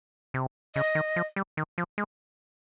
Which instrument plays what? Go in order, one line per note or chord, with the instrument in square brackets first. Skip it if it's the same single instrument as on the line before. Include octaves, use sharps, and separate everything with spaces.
[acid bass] C3
[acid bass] C#3 [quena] D#5
[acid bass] D#3
F3
G3
D#3
F3
G#3